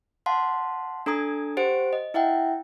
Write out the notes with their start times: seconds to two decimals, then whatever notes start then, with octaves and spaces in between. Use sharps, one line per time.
0.26 F5 F#5 A5 C6
1.06 D4 A4 A#5 D#6 G#6
1.57 G4 C5 F#5 D7
1.93 D#5
2.14 E4 E5 F#5 G5